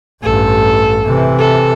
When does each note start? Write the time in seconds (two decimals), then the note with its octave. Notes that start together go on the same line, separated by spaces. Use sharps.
0.23 A1 G2 A4
1.04 C3 E3
1.39 A4